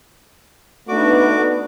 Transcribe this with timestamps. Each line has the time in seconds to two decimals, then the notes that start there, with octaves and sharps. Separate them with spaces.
0.88 A3 B3 D4 D#4 F#4 D6